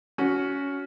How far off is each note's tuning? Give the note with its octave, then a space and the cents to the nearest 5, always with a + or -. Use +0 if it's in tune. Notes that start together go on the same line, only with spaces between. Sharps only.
C#4 +15 F#4 +0